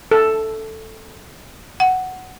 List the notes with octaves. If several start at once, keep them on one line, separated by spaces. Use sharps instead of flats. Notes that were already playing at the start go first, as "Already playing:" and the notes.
A4
F#5